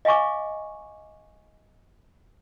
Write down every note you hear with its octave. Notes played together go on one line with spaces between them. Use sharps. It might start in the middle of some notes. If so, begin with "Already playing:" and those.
D#5 F5 G#5 C#6 D6